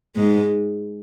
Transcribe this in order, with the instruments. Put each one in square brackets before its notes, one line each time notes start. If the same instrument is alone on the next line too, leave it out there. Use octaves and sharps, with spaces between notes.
[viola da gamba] G#2 G#3